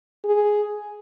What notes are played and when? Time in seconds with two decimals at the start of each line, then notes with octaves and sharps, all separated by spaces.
0.25 G#4